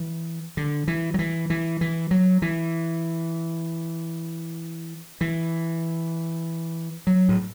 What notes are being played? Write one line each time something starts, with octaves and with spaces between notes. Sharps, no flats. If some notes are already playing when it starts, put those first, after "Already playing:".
Already playing: E3
D3
E3
F#3
E3
E3
E3
F#3
E3
E3
F#3
A2